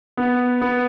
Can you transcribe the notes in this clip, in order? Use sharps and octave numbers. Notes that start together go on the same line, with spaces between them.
B3
B3